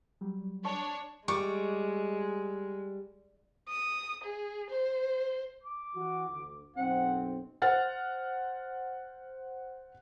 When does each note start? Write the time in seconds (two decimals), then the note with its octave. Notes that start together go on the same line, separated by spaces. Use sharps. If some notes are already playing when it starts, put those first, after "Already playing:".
0.21 F#3 G3
0.65 D4 C#5 A5 C#6
1.28 G3 G#3 C#6 D6
3.69 D#6
4.24 G#4
4.70 C5
5.63 D6
5.96 E3 F#4
6.29 D2
6.76 B1 F#2 C4 F#5
7.62 C5 F#5 F6 A6